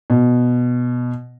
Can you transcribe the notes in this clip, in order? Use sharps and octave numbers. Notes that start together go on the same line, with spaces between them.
B2